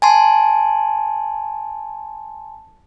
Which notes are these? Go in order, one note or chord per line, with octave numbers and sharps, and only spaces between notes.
G#5 A5 C6